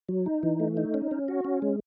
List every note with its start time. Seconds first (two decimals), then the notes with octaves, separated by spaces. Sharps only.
0.09 F#3
0.26 D#4
0.43 E3
0.60 A3
0.77 D#4
0.94 C#4
1.11 C#4
1.28 F#4
1.45 C#4
1.62 G#3